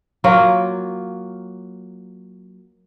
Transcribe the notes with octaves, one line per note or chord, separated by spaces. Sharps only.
F#3 A#3 F4